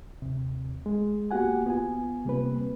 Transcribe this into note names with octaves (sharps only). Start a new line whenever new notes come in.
D#2 C3
G#3
A#3 B3 F#4 G4 F#5 G#5
B3 F4 G#5
C3 G3 A#3 C4 B4